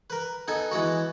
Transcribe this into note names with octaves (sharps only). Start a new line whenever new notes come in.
A#4 B4
B3 D#4 A4 G#5
E3 G#3 B3 F#4